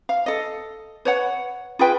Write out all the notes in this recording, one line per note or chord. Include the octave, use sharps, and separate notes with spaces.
F5
A4 D#5
B4 C#5 F#5
F4 G#4 B4 G5